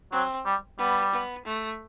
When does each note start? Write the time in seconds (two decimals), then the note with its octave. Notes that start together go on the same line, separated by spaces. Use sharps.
0.12 F#3 C4
0.45 G3
0.79 G3 B3
1.13 B3
1.45 A3